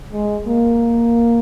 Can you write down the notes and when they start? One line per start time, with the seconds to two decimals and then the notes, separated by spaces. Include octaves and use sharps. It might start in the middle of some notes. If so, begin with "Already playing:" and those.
0.12 G#3
0.47 A#3